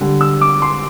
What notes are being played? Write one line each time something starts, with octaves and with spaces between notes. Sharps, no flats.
D3 G3
E6
D6
C6